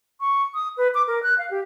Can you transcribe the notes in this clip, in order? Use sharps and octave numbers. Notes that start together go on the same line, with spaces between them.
C#6
D#6
B4
D6
A#4
F#6
F5
G4